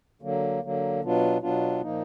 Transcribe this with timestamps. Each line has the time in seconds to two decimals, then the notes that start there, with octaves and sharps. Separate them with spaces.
0.22 D3 F#3 A#3
0.62 D3 F#3 A#3
1.02 B2 F#3 B3 D4 F4
1.41 B2 F#3 B3 D4 F4
1.81 A#2 F3 A#3 D#4